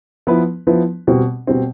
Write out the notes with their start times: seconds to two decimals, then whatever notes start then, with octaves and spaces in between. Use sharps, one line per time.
0.27 F3 B3 E4 B4
0.67 F3 B3 E4 B4
1.07 B2 G3 C4
1.47 B2 G3 C4